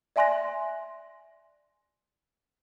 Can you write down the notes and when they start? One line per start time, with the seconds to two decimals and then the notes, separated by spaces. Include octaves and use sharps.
0.16 D5 E5 G#5 C6 F#6 A#6